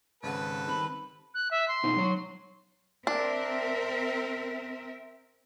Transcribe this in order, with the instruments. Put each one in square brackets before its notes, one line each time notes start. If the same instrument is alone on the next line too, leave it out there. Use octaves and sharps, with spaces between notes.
[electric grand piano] G#1 C#3 F#5 [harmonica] A4 B4
[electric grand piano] D#3 G3 C4 [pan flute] B5
[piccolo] F#6
E5
C6
[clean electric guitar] B2 D#4 C5
F#3 C#5
[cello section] C4 A#4 E5 [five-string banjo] D4